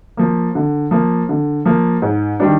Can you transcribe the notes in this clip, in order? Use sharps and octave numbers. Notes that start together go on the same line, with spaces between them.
F3 A#3
D3
F3 A#3
D3
F3 A#3
G#2
D#3 G3 D4